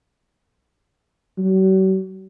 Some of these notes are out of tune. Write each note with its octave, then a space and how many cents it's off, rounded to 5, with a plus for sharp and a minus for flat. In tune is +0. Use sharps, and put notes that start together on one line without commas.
F#3 +45